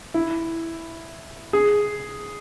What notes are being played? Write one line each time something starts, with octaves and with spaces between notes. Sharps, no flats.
E4
G#4